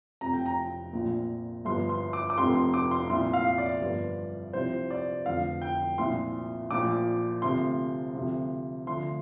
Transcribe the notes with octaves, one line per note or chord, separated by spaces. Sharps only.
F1 F2 C3 F3 A#5
G5
A#5
A#1 A#2 F3
G1 G2 F3 C6
C6
D6
D6
F1 F2 C3 F3 C6
C6
D6
C6
C2 A#2 F3 C6
F5
D5
G1 G2 F3
C2 C3 F3 C5
D5
F1 F2 D3 F3 F5
G5
C2 A#2 F3 C6
A#1 A#2 F3 D6
D2 C3 F3 C6
D2 C3 F3
D2 D3 F3 C6